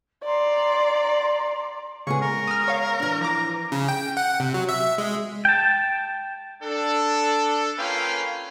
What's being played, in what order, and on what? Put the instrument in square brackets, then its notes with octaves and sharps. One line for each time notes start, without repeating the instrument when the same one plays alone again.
[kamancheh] D5 [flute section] A#5 C6
[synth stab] C#3 [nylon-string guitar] G#3 B3 G#4 [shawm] C#6
[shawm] A#4
[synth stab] D#6 F6
C#5 F5
[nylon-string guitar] E3 D4
[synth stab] F3 D6 [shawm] A#5
[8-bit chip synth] C#3
G5
F#5
C3
F#3
E5
G#3
[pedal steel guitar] G5 A5
[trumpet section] D4 A4
A#3 C#4 F4 B4 F5 G5